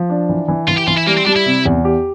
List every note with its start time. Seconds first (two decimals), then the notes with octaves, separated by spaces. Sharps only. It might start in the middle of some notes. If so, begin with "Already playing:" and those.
Already playing: F3
0.09 D4
0.29 E3
0.48 E3
0.68 E3 F4
0.77 G4
0.87 E3 F4
0.97 E4
1.07 G3 A#3
1.17 C4
1.26 G3 D4
1.36 E4
1.46 C3
1.66 E2
1.85 G4